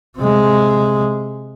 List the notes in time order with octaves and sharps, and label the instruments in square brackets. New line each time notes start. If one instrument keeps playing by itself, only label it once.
[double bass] C3 G#3